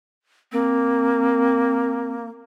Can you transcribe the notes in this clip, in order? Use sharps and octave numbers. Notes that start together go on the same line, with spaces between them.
A#3 C4